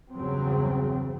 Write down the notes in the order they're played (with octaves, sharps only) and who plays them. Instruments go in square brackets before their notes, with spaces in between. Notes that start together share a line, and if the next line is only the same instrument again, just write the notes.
[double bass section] E2 G2 C#3 F#3 C4